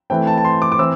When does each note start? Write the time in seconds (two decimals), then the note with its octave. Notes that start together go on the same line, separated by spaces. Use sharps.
0.10 E3 A3 C4 G5
0.27 A5
0.38 A5
0.45 C6
0.62 D6
0.72 D6
0.79 E3 C4 E6